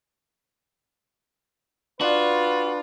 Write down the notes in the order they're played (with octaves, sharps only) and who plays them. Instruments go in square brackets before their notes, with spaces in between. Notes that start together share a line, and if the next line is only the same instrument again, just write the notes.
[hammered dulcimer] D4 [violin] F4 [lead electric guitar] F#4 [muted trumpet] B4